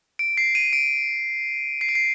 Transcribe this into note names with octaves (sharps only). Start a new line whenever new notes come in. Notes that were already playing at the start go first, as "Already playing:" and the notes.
D7
C7
D#7
D7
C7
D7
C7